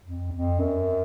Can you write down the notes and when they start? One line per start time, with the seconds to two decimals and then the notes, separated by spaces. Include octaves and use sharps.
0.05 F2
0.32 F2
0.60 F#2